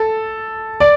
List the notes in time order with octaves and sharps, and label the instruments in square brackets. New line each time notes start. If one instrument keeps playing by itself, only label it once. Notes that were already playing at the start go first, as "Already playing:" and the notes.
Already playing: [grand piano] A4
D5